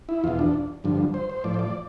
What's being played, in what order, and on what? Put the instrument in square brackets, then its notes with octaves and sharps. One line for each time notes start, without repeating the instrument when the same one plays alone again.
[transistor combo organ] E4
E2 B2 F4
D4
G2 D3 F3
C5
C5
A2 F3 D5
C5
D5